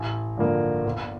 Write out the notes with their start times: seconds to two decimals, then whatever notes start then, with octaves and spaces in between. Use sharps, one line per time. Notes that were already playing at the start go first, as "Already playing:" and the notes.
Already playing: A1
0.37 G2 D3 F3 A#3
0.86 G1